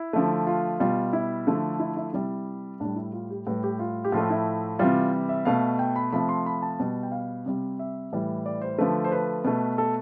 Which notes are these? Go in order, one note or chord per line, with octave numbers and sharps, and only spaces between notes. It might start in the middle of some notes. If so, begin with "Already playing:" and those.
Already playing: E4
D3 F3 A3
F4
B2 G3 F4
E4
D3 F3 A3
E4
E4
C3 G3 E4
A2 G3 D4
E4
F4
G4
A2 G3 B4
G4
F4
G4
A2 F3 A3 F4
E4
C3 E3 G3 F4
E5
B2 A3 F5
G5
B5
C3 F3 A3 B5
C6
B5
A5
B2 G3
G5
F5
C3 G3
E5
A2 E3 G3
D5
C5
D3 F3 A3 B4
C5
B4
B2 A3
A4